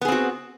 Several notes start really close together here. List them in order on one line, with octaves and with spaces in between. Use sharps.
B3 G#4 C4 F#4